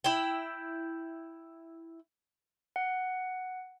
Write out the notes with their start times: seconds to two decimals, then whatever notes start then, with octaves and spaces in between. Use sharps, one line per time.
0.04 E4 G5
2.76 F#5